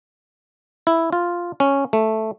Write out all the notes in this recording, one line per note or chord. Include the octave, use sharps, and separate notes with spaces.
E4
F4
C#4
A3